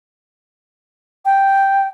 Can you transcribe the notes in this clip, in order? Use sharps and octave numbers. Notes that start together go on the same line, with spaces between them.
G5